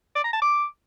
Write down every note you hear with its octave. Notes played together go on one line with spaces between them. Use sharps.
D5
A#5
A5
D6